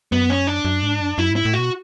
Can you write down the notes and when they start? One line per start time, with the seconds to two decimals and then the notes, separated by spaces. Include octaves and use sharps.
0.12 F#2 B3
0.30 C#4
0.47 D4
0.65 F#2
0.83 G#2
1.01 F#2
1.18 F#2 E4
1.31 G#2
1.36 E4
1.45 A2
1.54 B2 F#4